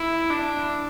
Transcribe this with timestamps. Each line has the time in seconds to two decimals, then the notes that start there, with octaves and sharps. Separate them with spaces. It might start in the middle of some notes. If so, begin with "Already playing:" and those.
Already playing: E4
0.30 D4